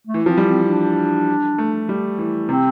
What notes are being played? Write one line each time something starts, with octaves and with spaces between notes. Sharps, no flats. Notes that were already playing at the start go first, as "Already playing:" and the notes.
A3
E3
F3 C4
G3
C4
D4
A3
G3
E3
C3 C4